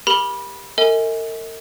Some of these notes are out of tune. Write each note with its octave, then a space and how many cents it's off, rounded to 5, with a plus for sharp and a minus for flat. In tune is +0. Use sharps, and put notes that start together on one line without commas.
G4 +10 A#4 +5 B5 -20
A#4 -45 D#5 +45 G#5 +0